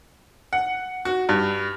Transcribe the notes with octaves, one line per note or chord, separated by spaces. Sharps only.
F#5
F#4
G2